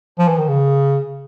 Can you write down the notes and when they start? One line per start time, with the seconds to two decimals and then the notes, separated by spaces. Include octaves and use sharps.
0.19 F3
0.28 E3
0.38 D#3
0.48 C#3